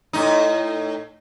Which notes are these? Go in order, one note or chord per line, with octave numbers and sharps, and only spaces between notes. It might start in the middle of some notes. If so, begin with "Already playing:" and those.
A2 D#4